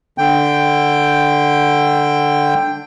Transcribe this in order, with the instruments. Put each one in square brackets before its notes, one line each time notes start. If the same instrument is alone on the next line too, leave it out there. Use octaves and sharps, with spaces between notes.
[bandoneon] D3 G5